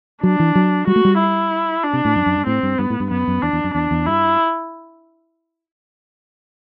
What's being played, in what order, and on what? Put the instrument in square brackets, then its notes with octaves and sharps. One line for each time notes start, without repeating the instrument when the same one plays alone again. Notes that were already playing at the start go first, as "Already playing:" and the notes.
[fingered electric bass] F#3 [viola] D4
[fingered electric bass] E3
F#3
[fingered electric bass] G3 [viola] F#4
[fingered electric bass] A3
G3
[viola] E4
D4
[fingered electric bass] C3
A2
F#2
F#2
G2
[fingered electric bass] A2 [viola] C4
[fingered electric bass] G2
[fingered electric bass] G2 [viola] B3
[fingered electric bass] A2
G2
[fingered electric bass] F#2 [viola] B3
[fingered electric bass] F#2
[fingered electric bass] E2 [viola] D4
[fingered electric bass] E2
F#2
[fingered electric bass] E2 [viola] D4
[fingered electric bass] E2
[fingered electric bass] G2 [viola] E4